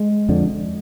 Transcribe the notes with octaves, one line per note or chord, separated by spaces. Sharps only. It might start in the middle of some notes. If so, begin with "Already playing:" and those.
Already playing: G#3
F2 D3